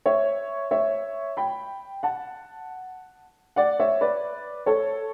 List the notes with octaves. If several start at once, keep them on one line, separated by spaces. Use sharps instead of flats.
C#5 E5
C#5 E5
G5 B5
F#5 A5
D5 F#5
C#5 E5
B4 D5
A4 C#5